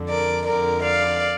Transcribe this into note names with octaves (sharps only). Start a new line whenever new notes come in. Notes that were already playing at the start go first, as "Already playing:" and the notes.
Already playing: F2 D3
A#4 D5
F2 D3 A#4 D5
D5 F5